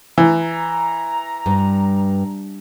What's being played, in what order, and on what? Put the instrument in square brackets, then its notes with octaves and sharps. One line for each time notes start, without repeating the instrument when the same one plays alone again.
[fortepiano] E3 [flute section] A#5
[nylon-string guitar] G2